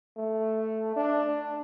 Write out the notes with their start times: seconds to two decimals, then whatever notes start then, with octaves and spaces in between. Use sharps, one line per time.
0.17 A3
0.96 D4